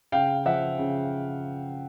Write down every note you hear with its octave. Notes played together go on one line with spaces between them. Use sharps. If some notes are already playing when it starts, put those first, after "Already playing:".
C#3 F5 G5
F3 E5 F#5
C#3